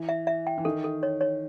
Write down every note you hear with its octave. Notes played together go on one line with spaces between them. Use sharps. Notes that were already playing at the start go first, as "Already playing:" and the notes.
Already playing: E3
E5
E5
G5
E3
D#3 A4
A4
C#5
C#5